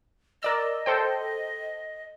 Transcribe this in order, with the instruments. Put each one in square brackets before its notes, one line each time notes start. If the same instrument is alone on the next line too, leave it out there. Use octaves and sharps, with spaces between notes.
[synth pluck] A#4 D5 E6 [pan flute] D#5
[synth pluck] A4 C5 G5